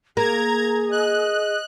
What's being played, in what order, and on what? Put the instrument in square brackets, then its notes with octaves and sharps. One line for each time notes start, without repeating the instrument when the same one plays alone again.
[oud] A#3 [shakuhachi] G#4 [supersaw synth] A#5 G#6
[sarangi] D#5 [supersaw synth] F#6